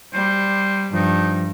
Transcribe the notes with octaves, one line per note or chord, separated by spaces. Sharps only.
G3 C5
G2 F3 D#4